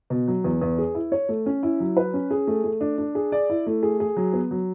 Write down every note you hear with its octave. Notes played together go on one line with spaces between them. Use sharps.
B2
F#3
E2
E2
G#4
E4
C#5
A3
C#4
E4
F#3
B4
C#4
G#4
A3
A3
D4
D4
G#4
D5
E4
A3
G#4
G#4
F#3
B3
F#3